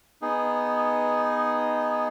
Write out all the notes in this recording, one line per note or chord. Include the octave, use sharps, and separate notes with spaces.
B3 D#4 G#4